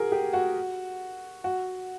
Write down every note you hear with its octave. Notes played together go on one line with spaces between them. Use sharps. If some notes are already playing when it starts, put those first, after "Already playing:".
Already playing: F#4 G#4 A#4
G4
F#4
F#4